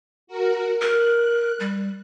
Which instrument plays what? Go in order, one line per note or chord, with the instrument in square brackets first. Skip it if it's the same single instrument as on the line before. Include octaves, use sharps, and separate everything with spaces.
[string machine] F#4 A#4
[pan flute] A#4 [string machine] F#6
[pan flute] G3